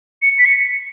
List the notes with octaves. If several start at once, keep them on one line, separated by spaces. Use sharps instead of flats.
C#7
B6
C#7